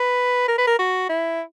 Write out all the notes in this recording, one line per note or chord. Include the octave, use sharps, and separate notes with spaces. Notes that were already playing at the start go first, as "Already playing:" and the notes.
Already playing: B4
A#4
B4
A#4
F#4
E4